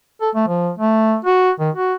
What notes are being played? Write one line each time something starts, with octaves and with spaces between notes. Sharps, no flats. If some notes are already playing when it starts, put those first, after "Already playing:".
A4
A3
F3
A3
F#4
D#3
F#4